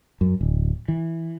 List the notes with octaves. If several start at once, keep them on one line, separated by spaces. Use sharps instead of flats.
F#2
D1
E3